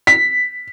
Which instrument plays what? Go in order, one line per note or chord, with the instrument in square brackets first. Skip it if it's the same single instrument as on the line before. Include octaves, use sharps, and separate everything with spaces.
[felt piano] B6